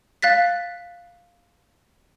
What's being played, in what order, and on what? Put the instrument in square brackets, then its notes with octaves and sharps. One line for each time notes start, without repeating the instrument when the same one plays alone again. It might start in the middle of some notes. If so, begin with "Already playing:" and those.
[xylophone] F5 F#6 A6 B6